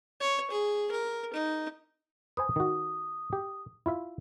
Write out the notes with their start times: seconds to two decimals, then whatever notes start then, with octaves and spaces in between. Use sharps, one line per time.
0.20 C#5
0.50 G#4
0.91 A#4
1.33 D#4
2.37 B4 C5 G#5 D#6
2.56 D#3 F#4
3.33 G4
3.86 E4 F4 E5